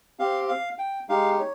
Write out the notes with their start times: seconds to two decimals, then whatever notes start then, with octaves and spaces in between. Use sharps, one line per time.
0.19 C4 G4 F5
0.48 F5
0.78 G5
1.09 G#3 D#4 G4 F5
1.39 C#5